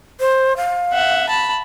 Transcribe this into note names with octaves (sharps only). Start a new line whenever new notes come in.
C5
F5
E5 F#5
A5 B5